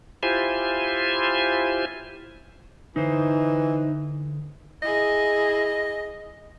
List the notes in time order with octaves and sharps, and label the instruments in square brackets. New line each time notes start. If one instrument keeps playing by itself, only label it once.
[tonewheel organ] E4 F4 G4 C5 G#5
[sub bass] D3 [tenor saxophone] E3 [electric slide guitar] D#4 C5
[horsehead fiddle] E4 G#4 [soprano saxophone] D#5